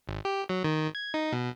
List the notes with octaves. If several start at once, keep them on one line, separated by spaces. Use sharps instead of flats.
G#1
G4
F#3
D#3
G#6
D#4
B2